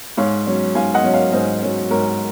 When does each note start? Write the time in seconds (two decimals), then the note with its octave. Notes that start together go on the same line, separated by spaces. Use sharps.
0.17 G#2 C#5 F5
0.47 F#3 C#4
0.75 G#2 F5 G#5
0.94 D#5 F#5
1.04 F#3 C#4
1.13 C#5 F5
1.33 G#2 C5 D#5
1.62 F#3 C#4
1.91 G#2 A#4 C#5